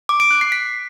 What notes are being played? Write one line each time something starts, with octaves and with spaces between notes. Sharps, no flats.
D6
D7
F#6
C7
B6